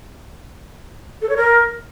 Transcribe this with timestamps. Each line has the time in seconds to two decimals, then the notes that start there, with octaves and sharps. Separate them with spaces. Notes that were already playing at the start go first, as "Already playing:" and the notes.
1.22 A4
1.29 C#5
1.37 A#4